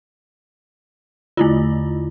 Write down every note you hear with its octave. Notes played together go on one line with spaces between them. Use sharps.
E2 D3 A3 E4 F4